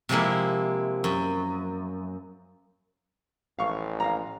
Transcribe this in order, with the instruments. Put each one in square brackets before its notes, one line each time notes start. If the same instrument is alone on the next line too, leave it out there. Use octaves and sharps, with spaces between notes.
[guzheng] C3 F3 G#3 A#3 E4
F#2
[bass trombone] A1 [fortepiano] F5 C#6
[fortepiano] F5 A#5